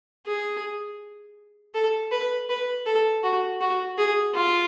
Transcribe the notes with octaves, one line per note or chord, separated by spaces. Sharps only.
G#4
A4
B4
B4
A4
F#4
F#4
G#4
F4